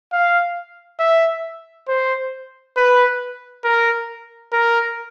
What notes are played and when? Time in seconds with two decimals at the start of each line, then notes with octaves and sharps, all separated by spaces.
0.12 F5
1.00 E5
1.88 C5
2.77 B4
3.64 A#4
4.53 A#4